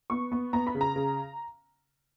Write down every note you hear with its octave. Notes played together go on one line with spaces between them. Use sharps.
B3 C#6
B3
B3 A#5
B5
C#3
A#5
C#3